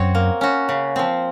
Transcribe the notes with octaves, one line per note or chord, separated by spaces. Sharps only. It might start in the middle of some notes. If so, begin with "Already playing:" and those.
Already playing: F#2 C4 F#4 C#5
A#3
C#4 F#4
C#3
F3 C4